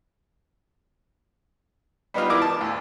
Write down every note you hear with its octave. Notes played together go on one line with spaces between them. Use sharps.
G3 G#3 B3 D#4 F4
E3 E4 A#4 D6
A5
D2